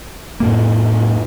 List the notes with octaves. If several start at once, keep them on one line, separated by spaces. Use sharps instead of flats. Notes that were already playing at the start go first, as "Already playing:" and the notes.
F2 A2 A#3